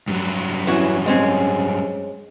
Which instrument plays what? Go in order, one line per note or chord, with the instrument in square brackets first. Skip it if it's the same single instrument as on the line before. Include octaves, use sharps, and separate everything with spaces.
[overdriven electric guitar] G2 F#3
[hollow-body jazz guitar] E3 C#4 F#4
G#3 C4 C#4